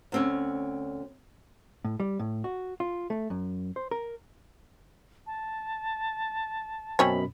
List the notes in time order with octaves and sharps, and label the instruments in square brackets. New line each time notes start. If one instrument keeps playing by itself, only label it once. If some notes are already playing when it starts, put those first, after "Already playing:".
[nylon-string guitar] D2 C4 C#4
[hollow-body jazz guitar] A2
G3
A2
F#4
F4
A3
F#2
C5
A#4
[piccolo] A5
[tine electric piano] F#2 B2 B5 [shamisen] C4 C#4 C#5